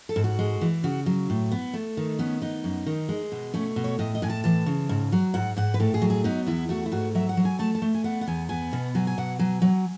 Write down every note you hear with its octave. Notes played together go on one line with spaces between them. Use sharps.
A4
G#2
F#4
G#3
E3
C#3 F#4
F#3
A2
B3
A3
D#3
B3 C#4
B3 D#4
F#2
D#3
G#3
B2
A3 C#4
B2
C#5
A2 D#5
D#5
A2 G#5
A5
E3 A5
C#3
G#2
F#3
G#2 F#5
G#2 F#5
B4
A2 A4
G#4
F#3
G#4
B3 D#4
E2 E4
A3 F#4
E4
G#2 F#4
F#3 E5
F#5
F#3
G#5
A3 A5
A5
A3
G#5
B3 F#5
F#5
E2 G#5
B3 G#5
B2
F#3 G#5
G#5
B2 F#5
F#3 G#5
F#3